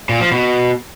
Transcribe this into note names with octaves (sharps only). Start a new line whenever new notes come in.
A#2
F3
B2